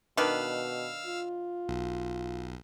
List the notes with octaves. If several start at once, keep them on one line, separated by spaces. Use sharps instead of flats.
B2 D#3 D4 B4 F5 E6 F6
F4
B1